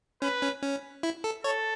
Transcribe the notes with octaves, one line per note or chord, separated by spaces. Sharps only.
C#4 B4
C#4
C#4
E4
A4
A4 C#5